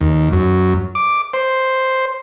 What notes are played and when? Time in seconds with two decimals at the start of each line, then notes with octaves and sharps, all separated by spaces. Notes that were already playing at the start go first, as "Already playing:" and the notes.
0.01 D#2
0.32 F#2
0.95 D6
1.34 C5